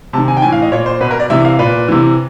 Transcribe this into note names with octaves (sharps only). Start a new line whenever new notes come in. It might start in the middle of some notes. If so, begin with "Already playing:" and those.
C3 D#3 A5
G#5
G5
A2 E3 G#5
F5
D#5
A#2 C#5
C5
B2 B4
A#4
D5
C3 E3 E5
F5
A#2 B4
C3 E3